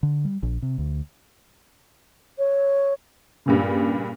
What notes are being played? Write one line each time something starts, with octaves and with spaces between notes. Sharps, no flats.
D3
G3
A#1
C3
D2
C#5
G2 A#2 C#3